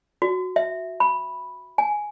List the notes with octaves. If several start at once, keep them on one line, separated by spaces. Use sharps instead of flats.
F#4
E5
B5
G#5